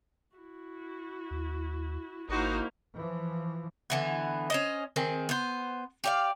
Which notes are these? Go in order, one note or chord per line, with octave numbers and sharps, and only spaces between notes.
E4 F#4
D#2
G#1 A#3 D#4 E4 F#4 C5
E3 F3
D3 E3 B3
C#4 C5 D#5
D#3 C4 G#4
B3 C5
G4 D5 F5